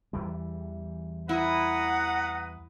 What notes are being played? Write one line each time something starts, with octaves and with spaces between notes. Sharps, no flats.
E2 E3 G3
E4 B4 F#5 A#5 D#6